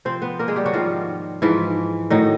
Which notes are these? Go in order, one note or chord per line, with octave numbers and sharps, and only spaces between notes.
C3 F3 C4 C5
B3 B4
A#3 A#4
G#3 G#4
G3 G4
F#3 F#4
G#2 D#3 F3 G3 F4
G#2 E3 F3 E4
A2 D#3 F#3 D#4